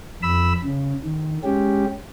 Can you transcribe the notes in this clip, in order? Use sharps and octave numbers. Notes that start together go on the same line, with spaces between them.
F2 B5 E6
C#3
D#3
G#3 C#4 G4